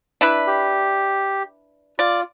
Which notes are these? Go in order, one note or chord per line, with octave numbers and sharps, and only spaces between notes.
D4 E4 B4
G4
F4 D5